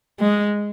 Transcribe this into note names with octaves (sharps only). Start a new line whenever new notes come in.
G#3